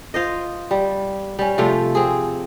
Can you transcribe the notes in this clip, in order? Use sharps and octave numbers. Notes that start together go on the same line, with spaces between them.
F4 C5 D#5
G3
G3 C#4
C3 F3 A3 F4
C4 G#4